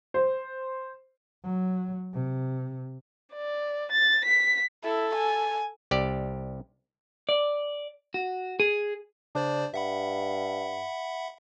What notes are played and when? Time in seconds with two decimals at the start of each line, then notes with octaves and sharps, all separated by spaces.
0.14 C5
1.44 F#3
2.13 C3
3.34 D5
3.92 A6
4.25 B6
4.84 E4 A4
5.15 G#5
5.91 C2 G4 D5
7.29 D5
8.14 F#4
8.60 G#4
9.35 C#3 D4 C5 D5
9.74 G2 E5 F#5 B5